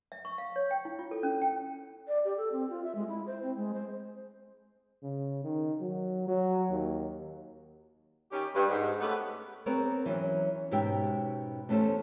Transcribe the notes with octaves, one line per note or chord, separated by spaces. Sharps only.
E5
C#6
F5
C#5
G5
E4
F4
A4
C#4
G5
D5
G4
A4
C4
F4
E5
G#3
E4
C5
C4
G#3
C5
C#3
D#3
F#3
F#3
D#2
D#3 C#4 G4
G2
G#2
A3 B3 C#4 G4 B4
B3 C4 G#4 A#4 C#5
E3 F#3 C#4
G#2 B2 C#4 G4 E5 G5
E2 A3 C#4 G4 A4 C5